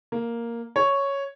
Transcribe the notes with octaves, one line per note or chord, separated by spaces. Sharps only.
A#3
C#5